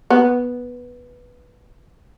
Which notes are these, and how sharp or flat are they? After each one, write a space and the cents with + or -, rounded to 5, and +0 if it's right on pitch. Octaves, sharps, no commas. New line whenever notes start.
B3 -5